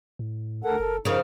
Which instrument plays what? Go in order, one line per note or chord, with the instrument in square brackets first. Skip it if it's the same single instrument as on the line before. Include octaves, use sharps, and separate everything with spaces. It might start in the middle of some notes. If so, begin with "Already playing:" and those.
[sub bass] A2
[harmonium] D2 A4 F#5 [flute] A#4
[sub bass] F#1 [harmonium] A4
[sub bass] G2 [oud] C#3 F3 [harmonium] D#4 [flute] A#4